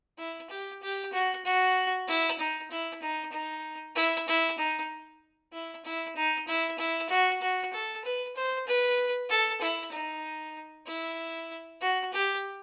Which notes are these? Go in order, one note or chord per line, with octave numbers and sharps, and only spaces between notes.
E4
G4
G4
F#4
F#4
E4
D#4
E4
D#4
D#4
E4
E4
D#4
E4
E4
D#4
E4
E4
F#4
F#4
A4
B4
C5
B4
A4
E4
D#4
E4
F#4
G4